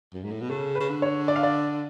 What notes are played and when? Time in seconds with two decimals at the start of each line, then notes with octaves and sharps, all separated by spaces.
0.14 F#2
0.24 G#2
0.32 A2
0.41 B2
0.49 C#3 A4
0.75 C#3 B4
0.90 D3
1.02 C#5
1.28 D5
1.36 F5
1.43 D5